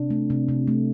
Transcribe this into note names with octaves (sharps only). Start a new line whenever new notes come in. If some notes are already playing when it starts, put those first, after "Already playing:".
Already playing: C3 D4
A3
C3
C3
A3